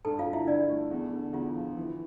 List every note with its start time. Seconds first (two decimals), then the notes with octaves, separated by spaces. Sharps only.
0.05 G2 A4 A5
0.19 F4 F5
0.26 D3
0.33 E4 E5
0.47 D4 E4 D5
0.69 A3
0.91 E2
1.12 D3
1.33 E2 F4
1.55 F3
1.77 E3